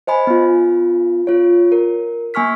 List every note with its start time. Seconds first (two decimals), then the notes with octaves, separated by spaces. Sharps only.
0.07 C5 D#5 G#5 B5
0.27 B3 F4
1.27 F4 C#5
1.72 A#4
2.34 A#3 G#5 C#6 F6 B6